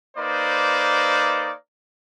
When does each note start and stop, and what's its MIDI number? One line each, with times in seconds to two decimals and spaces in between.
0.17 1.51 58
0.17 1.51 63
0.17 1.51 71
0.17 1.51 72
0.17 1.51 74